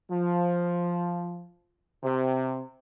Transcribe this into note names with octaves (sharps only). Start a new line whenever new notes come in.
F3
C3